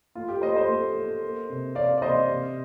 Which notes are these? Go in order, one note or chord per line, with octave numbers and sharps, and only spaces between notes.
A3 F4
G4
A3 C5 D#5
C5 D#5
A3
A3
A#3
C3
C3 D5 F5
D5
C3 C5 D#5
C3